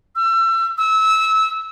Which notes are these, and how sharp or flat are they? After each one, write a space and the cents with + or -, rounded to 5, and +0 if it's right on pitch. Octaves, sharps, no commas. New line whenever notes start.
E6 +30
E6 -25